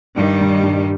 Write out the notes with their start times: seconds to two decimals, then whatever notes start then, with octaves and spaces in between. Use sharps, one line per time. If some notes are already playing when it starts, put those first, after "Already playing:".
0.17 G2 D#3 G3
0.41 G2
0.63 G2